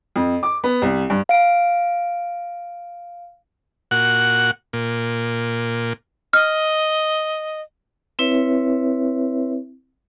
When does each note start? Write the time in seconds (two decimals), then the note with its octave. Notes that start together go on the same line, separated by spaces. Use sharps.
0.16 F2
0.43 D6
0.64 B3
0.82 C2
1.10 G2
1.29 F5 D7
3.91 A#2 F#4 F#5
4.73 A#2
6.33 D#5 F6
8.19 C4 E4 B4 C#5 E5